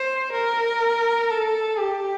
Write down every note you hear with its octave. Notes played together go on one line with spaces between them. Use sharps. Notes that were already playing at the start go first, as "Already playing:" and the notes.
Already playing: C5
A#4
A4
G4